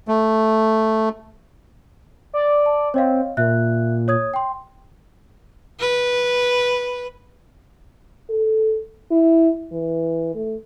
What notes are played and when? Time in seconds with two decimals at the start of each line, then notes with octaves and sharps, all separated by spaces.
0.08 A3
2.34 D5
2.66 A5
2.94 C4 C#5 D#5 F5
3.37 A#2 E5 F#6
4.08 C#5 D#6 G#6
4.34 G5 C6
5.80 B4
8.30 A4
9.11 E4
9.72 E3
10.35 A3